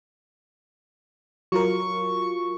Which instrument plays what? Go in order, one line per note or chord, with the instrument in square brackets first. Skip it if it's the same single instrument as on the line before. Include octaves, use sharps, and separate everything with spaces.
[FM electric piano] F#3 F4 A#4 [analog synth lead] C#6